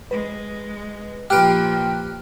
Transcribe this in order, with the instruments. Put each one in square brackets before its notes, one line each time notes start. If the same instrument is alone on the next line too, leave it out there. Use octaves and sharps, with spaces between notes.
[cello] G#3 [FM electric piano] B4
[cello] A#2 F3 [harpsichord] G4 B4 [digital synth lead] G5 [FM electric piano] F6 F#6